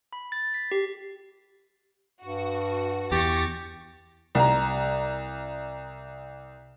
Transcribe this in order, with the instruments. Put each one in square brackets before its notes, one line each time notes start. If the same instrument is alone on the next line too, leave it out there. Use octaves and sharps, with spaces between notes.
[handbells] B5
A6
B6
G4
[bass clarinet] G2 [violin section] F#4
[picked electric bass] E2 [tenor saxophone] G4 [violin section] C#6 A6 A#6
[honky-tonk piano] C2 A#5